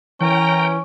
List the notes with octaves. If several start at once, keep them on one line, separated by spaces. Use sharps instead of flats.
E3 C#4 A#4 C#5 G5 A#5